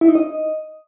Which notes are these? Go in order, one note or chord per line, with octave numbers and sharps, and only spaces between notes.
E4
D#4
D#5